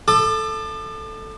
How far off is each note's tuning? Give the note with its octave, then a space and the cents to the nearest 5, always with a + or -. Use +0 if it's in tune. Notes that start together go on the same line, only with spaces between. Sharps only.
A4 +0 D6 +40